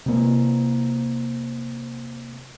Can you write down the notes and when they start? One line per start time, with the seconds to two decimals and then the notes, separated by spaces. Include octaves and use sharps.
0.06 C3 A#3